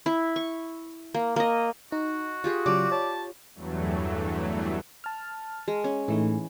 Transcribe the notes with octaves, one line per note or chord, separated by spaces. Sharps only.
E4
C#6
A#3
A#3 D#5
D#4 F#4
F4 G4 G#4
C#3 F#3 G4 D5
C#5 A5
E2 G2 E3 F#3 A3
A5 F6
G#3
C#4
A2 E3 A3 D#4